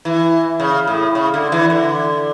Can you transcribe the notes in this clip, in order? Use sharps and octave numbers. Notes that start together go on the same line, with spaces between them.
E3
C#3
A2
C#3
D3
E3
D3